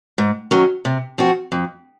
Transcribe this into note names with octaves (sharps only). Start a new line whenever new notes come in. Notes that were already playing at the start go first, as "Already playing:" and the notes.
G#2
D#3 F#3 C#4
C3
F3 C4 F#4
F2